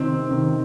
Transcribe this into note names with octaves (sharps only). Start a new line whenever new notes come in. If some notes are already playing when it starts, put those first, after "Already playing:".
Already playing: C3 D#3 C4
C3 D#3